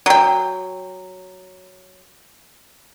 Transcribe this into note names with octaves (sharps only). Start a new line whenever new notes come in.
F#3 G5